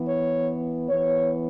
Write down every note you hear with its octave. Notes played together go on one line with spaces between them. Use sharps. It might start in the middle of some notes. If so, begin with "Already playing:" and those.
Already playing: E3 B3
C#5
E3 B3 C#5